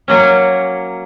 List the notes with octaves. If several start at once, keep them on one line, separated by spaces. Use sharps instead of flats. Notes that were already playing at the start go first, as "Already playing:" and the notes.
F#3 A#3 C#4